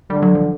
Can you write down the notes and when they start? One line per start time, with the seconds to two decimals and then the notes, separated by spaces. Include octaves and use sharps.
0.10 D3 G3
0.22 F#3
0.35 F3